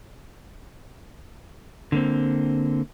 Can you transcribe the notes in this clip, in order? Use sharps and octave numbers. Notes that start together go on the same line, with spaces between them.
D3 A#3 C4